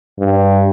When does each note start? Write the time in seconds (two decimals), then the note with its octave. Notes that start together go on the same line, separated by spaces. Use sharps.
0.19 G2